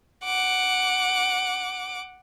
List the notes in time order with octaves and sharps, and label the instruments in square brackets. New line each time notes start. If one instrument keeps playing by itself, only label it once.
[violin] F#5 D6